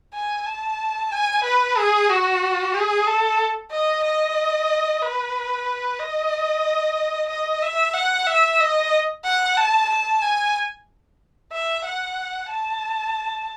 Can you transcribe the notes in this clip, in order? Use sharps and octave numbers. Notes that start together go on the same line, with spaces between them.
G#5
A5
G#5
B4
G#4
F#4
G#4
A4
D#5
D#5
B4
D#5
D#5
E5
F#5
E5
D#5
F#5
A5
A5
G#5
E5
F#5
A5